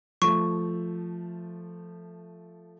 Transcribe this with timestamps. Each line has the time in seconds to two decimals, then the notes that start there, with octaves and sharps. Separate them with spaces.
0.22 F3 A3 C#6